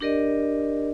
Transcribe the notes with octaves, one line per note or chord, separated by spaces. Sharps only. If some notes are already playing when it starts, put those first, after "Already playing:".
D4 G4 A#4 D5 D#5